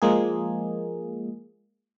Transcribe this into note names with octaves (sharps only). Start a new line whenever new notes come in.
F3 G#3 A#3 G#4